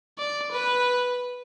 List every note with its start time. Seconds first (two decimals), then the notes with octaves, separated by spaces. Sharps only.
0.19 D5
0.52 B4